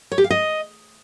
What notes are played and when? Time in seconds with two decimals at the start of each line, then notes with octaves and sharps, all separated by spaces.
0.12 C#5
0.18 G4
0.24 F5
0.31 D#5